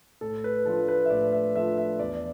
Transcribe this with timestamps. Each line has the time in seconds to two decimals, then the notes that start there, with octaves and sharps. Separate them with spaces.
0.21 A2 A4
0.44 B4
0.65 F3 A3 D4 F4 A4
0.88 B4
1.05 E5
1.10 A2 D5
1.32 E5
1.55 F3 A3 D4 F4 E5
1.78 E5
1.99 E2 D5